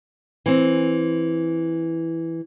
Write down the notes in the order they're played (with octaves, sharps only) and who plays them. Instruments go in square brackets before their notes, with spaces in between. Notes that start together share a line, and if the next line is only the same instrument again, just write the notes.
[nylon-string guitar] E3 C4